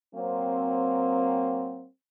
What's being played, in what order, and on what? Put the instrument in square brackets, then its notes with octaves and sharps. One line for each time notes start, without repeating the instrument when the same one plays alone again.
[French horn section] F#3 A#3 C4